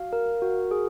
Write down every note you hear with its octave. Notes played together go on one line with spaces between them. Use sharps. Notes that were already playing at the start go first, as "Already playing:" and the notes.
Already playing: F#4 F5
A#4
F#4
G#4